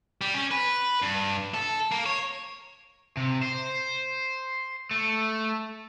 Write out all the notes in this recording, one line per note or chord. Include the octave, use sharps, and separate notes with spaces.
G3
C#4
B4
G2
A4
A#3
C#5
C3
C5
A3